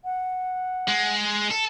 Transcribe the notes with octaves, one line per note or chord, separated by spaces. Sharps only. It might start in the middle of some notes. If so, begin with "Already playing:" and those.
F#5
G#3
A4